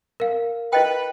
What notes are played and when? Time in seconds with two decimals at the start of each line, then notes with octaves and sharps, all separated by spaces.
0.20 A#4 F5
0.73 E4 B4 D#5 G5